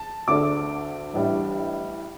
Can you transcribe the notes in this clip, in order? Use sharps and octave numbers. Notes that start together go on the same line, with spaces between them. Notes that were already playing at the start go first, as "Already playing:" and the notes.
Already playing: A5
D2 D3 A3 D4 D6
A1 A2 G3 D4